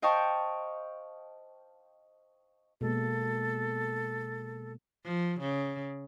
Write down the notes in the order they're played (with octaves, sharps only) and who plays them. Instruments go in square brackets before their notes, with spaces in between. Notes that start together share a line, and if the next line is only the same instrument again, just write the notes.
[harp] C5 D#5 F5 G5 A5 C#6
[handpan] B2 G#3 A#3 [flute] A4
[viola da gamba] F3
C#3